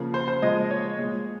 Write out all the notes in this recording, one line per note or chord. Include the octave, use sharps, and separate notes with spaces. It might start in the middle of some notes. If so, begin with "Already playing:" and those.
Already playing: C#3 F3 A#3
C5
C5
A#2 F3 G#3 D#5
C#5
A#2 G#3